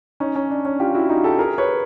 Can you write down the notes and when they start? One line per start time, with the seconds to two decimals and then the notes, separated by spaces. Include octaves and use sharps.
0.20 C#4 D#4
0.36 C#4
0.50 D4
0.65 C#4
0.80 F4 G4
0.94 E4 F#4
1.09 D#4 F4
1.24 G4 A4
1.39 G#4 A#4
1.58 B4 C#5